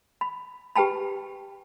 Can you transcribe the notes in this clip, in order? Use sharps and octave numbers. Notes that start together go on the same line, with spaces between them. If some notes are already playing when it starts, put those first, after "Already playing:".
B5
G4 B4 G5 A5 B5